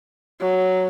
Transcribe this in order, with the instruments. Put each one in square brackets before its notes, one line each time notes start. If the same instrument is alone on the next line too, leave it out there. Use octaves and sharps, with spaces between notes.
[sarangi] F#3